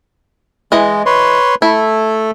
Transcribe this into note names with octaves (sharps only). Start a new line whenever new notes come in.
E3 G#3 D#5
B4 C#5 C6
A3 E4 A4